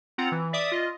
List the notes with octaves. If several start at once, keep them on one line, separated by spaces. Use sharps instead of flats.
C4 F4 F#5 A#5
E3
D5 E5 D6 D#6
F4 D#5